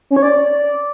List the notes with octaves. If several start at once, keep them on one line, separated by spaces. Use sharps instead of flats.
C#4
C#5
D5